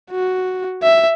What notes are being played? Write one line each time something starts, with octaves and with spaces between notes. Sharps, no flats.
F#4
E5